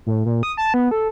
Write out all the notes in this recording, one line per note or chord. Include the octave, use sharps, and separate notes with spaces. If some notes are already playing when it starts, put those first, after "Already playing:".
A2
A#2
D#6
A5
B3
A4